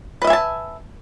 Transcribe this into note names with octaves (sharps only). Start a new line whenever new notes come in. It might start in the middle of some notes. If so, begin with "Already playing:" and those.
B4 D#5 E5 G#5 A5